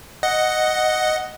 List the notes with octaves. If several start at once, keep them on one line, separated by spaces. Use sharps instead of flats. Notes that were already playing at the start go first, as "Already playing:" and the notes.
D#5 F#5